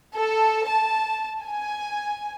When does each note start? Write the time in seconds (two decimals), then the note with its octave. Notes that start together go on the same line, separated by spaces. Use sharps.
0.17 A4
0.68 A5
1.43 G#5